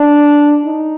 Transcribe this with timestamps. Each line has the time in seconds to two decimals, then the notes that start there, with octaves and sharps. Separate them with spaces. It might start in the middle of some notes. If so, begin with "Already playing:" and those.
Already playing: D4
0.65 D#4